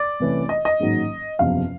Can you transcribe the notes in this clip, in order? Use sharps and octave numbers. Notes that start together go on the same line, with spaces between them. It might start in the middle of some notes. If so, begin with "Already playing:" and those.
Already playing: D5
C2 C3 E3 A3 C#4
D#5
D#5
A1 G#2 D#3 F#3 A#3
F#1 E2 C3 F3 F5